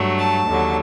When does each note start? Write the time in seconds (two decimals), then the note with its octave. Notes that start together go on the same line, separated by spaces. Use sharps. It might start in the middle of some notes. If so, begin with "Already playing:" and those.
Already playing: G2 F#3 A3
0.18 A5
0.47 D#2 D3 F#3